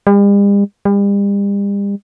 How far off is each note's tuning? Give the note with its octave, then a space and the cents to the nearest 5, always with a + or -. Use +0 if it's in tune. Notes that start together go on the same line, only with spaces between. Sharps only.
G3 +45
G3 +40